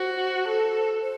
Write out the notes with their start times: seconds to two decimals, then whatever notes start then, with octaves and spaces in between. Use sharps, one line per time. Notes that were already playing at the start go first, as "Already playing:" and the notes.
Already playing: F#4 C5
0.48 A4
1.02 C5